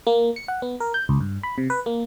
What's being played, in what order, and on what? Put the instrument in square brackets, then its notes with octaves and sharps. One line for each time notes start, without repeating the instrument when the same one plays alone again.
[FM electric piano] A#3
C#7
F#5
B3
A#4
G6
C#2
G2
B5
C3
B4
A#3